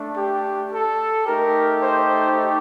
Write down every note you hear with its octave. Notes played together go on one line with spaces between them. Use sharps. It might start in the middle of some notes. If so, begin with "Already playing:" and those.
Already playing: A3 D4
G4
A4
A3 D#4 G4 A#4
C5